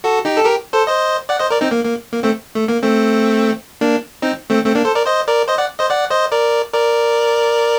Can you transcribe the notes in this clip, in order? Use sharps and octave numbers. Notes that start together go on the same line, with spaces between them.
F#4 A4
D#4 G4
A4
G4 A#4
A4 C5
C5 D#5
D5 F#5
C5 D#5
A#4 D5
C4 D#4
A#3
A#3
A#3
A3 C4
A3
A#3
A3 C4
A#3 D4
C4 D#4
A3 C4
A3 C4
A#3 D4
A4 C5
A#4 D5
C5 D#5
A#4 D5
C5 D#5
D5 F#5
C5 D#5
D5 F#5
C5 D#5
A#4 D5
A#4 D5